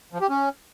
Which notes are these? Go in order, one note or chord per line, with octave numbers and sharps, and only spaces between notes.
F3
G4
C#4